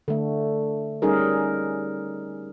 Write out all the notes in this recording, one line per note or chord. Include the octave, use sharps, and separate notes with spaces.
D3 A3
G3 C#4 D#4 G#4 A#4